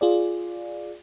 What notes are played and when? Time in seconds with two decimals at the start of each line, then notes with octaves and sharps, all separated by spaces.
0.01 F4 G#4 D5